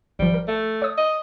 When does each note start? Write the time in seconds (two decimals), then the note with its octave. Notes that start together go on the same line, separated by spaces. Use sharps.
0.19 G#1 F3 G3
0.34 A#4
0.48 A3
0.82 C#5 D#6
0.97 D#5